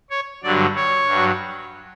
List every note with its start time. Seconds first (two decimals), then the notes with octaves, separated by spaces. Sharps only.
0.10 C#5
0.43 G2 D3 F#3 D5
0.76 C#5
1.09 G2 F#3